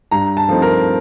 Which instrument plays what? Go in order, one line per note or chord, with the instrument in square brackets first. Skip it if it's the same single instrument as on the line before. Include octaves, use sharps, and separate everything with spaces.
[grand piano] G2 A#5
A5
F3 A3 C4 D#4
A#4